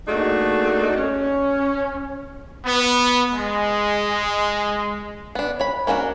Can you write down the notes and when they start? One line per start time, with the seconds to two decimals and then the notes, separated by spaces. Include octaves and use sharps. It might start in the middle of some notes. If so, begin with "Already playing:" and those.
0.08 A3 A#3 D4 D#4 F#4 G#4
0.96 C#4
2.66 B3
3.33 G#3
5.35 B3 D4
5.59 C#5 B5
5.87 A#3 C#4 D4 F4 F#4